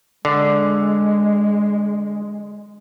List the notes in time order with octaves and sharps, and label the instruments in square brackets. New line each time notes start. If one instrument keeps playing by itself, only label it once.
[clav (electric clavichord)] D3 [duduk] G#3